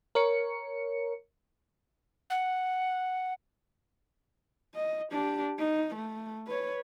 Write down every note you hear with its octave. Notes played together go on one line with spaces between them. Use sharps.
A#4 C#5 C#7
F#5
D#5
D4 G4
D#4
A3
B4 C#5